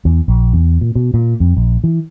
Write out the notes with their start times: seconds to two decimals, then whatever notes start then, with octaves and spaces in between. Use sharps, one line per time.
0.05 E2
0.28 A#1
0.53 E2
0.81 A#2
0.95 B2
1.14 A#2
1.40 F2
1.57 A#1
1.84 E3